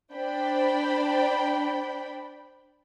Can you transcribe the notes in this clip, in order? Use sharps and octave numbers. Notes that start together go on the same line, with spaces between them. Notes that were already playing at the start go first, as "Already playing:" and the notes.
D4 C5 D5 G5 B5